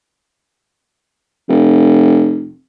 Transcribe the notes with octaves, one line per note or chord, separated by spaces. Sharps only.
F1